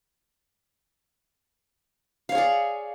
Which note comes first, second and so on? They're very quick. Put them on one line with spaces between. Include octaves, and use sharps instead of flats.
F5 C#5 G#4 D5